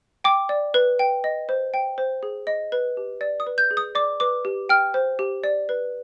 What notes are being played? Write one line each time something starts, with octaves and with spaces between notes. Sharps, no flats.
G5 D6
D5
B4
G5
D#5
C5
G5
C5
G#4
D#5
B4
G4
D5
D#6
B4
G6
G#4
D#6
D5 D6
B4 D6
G4
G5 F6
C5
G4
D5
B4